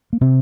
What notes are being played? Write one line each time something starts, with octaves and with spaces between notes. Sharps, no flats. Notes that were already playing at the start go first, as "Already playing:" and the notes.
A#3
C3 C4